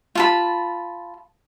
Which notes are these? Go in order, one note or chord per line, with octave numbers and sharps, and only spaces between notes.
F4 A5 B5